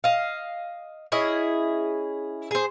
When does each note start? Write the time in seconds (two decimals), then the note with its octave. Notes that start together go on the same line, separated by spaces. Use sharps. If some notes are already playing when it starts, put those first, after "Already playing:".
0.04 D#5 F5
1.12 C#4 E4 G#4 D#5
2.51 G#4 C5